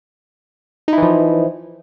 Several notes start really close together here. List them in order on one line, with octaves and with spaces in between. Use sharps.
D#4 E4 E3 F3